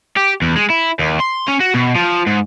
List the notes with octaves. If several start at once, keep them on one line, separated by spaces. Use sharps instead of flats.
G4
E2
G#3
E4
D#2
C6
C#4
F#4
B2
F3
G#2